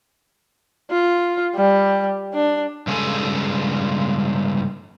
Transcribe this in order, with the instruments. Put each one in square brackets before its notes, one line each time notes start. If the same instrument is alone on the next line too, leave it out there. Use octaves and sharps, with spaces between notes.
[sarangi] F4
G3
D4
[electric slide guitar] G2 C#3 G#3 G#4 A4 G#5